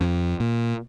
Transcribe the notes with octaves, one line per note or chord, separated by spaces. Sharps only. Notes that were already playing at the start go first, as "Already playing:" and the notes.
F2
A#2